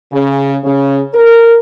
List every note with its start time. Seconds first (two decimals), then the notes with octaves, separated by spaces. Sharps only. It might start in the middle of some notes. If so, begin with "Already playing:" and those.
0.12 C#3
0.64 C#3
1.14 A#4